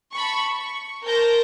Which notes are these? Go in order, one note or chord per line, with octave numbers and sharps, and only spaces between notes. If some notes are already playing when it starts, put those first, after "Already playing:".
A5 B5 C#6
C#6
A#4 C5 A5 G6 A#6